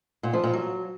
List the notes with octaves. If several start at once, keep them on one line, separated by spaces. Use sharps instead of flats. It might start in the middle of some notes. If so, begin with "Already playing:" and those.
A#2
F3
A#2
F#3